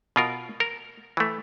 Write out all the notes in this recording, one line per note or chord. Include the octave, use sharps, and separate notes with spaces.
B2 F4 A#4
A#4
E3 A3